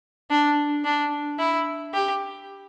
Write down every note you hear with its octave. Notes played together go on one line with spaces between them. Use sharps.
D4
D4
E4
G4